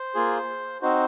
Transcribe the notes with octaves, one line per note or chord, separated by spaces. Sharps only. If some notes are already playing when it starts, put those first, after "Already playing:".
Already playing: C5
A#3 F4 G#4
C4 D#4 F#4 C5